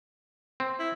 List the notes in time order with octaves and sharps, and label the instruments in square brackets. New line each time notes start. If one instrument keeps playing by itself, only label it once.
[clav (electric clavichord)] C4
[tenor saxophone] E4